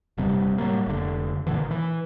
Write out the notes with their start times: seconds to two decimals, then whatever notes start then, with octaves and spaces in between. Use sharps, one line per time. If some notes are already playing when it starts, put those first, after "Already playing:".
0.18 D#1 G2 C3 G3
0.58 A2 F#3 G3 A#3
0.86 F1 D3
1.47 G1 A#2 D3 E3
1.58 D#3
1.71 E3